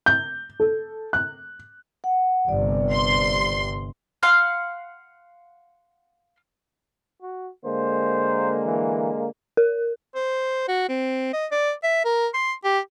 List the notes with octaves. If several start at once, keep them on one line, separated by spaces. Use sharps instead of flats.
G6
A4
F#6
F#5
G1 C3 D5
C6
F5 F#5 C6 F6
F#4
D3 G#3 A#3 C5
E3
A#4
C5
F#4
C4
D#5
D5
E5
A#4
C6
G4